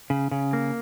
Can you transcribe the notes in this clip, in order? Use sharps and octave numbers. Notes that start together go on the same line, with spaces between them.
C#3
C#3
A#3